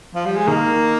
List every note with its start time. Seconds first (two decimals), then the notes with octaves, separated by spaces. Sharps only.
0.14 F3
0.26 G3
0.36 G#3
0.47 D#3 A#3